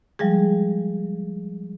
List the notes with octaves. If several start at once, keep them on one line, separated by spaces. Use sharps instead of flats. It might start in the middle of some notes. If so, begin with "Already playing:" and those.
F3 G3 G#3 G#4